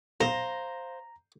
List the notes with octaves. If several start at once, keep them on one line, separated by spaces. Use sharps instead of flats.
B1 C5 F5 A#5 A#6